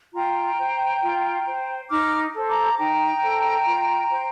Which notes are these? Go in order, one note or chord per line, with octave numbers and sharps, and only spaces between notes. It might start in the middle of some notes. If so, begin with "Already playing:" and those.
F4 G5 A#5
C5
F4
C5
D#4 D6 F6
A4 C5
A#5 D6
D#4 G5 A#5
A4 C5
F4
C5